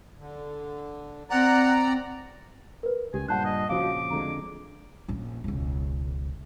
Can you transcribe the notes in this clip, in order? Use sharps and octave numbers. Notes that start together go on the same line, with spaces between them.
D3
C4 D5 F#5 A#5
A#4 B4
C#2 G4 G#5
G2 A#2 C5 F#5 A5 F#6
D#5
A#1 C#3 F3 F#4 F5 D6
F2 D3 G#3 A#5
A#1 C#4
E1 C#2